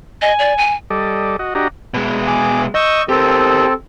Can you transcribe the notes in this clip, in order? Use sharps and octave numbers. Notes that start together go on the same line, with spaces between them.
D#5 G#5
D5
G#5
G3 A4 D5 D#5
F#4 D#5
D4 F#4 G4 D#5 A#5
B2 G#3
G#4 D6
D#5 C#6 E6 G6
C4 G4 A4 A#4